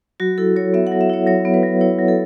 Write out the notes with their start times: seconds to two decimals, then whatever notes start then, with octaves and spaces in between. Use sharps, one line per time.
0.20 F#3 F#4
0.38 E4 A4
0.56 F#3 C#5
0.74 B3 E5
0.87 F#5
0.91 F#3
1.01 E5
1.10 E4 C#5
1.27 F#3 C#5
1.45 B3
1.54 B4
1.63 F#3
1.81 E4 C#5
1.99 F#3
2.08 A4